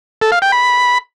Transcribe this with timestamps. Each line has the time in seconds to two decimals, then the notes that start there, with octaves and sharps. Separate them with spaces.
0.21 A4
0.32 F5
0.42 G5
0.52 B5